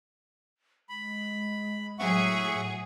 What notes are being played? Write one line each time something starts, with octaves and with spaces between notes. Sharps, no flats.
G#3 B5
A2 F#3 G#4 E5 F#5 C#6